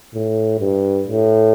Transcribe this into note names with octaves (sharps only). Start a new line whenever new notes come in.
A2
G2
A2